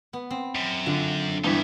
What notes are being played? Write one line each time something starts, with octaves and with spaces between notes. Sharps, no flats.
B3
C4
F#2
D3 F4
G2 E3 B3 D#4 E5